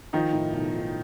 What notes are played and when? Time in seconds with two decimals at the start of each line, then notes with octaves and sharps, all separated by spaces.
0.13 D#3 F3 D#4
0.33 A2
0.53 B1
0.72 F3